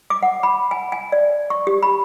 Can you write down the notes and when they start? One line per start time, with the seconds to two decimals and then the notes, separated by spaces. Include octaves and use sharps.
0.10 D6
0.23 F#5
0.43 B5
0.71 G#5
0.92 G#5
1.12 D5
1.50 C#6
1.67 G4
1.83 B5